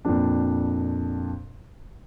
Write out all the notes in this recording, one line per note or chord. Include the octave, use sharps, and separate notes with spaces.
F2 A#2 F3 D4